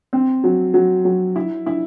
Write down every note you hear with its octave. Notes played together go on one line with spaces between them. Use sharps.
C4
F#3
F#3
F#3
E4
E4